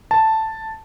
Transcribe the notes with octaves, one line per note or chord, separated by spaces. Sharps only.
A5